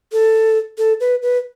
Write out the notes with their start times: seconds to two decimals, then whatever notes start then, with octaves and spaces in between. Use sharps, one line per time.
0.12 A4
0.78 A4
1.00 B4
1.23 B4